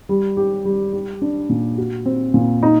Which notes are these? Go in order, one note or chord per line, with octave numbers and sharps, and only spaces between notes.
G3
G4
G3
G4
D4
A#2
F#4
C4
A#2
D#4